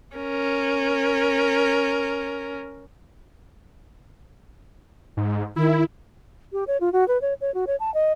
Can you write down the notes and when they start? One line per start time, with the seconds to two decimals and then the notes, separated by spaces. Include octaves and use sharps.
0.16 C#4 A#4
5.17 G#2
5.56 D#3 E4
6.53 G4
6.67 C#5
6.80 F4
6.92 F#4
7.08 B4
7.21 C#5
7.41 C#5
7.54 F#4
7.67 C#5
7.80 A5
7.94 D#5